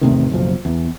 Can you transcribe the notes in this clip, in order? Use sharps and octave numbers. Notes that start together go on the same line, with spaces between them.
E2 A2 C3 D#3
F#1 B1 F3
E2